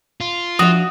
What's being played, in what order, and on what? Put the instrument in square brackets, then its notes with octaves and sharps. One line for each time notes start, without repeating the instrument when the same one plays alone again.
[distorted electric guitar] F4
[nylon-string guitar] F3 D4 E5 [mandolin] F#4 [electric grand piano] D#6